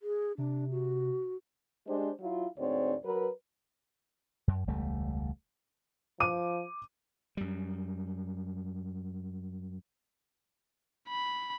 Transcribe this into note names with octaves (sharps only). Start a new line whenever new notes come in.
G#4
C3 D4
F#4
G#3 D4 G4 C5
F#3 E4 F4
D2 G#2 C4 C#5 D5
F#3 A#4 B4
F#2
E1 C#2 G3 A3
F3 D6 D#7
F#2 G3
B5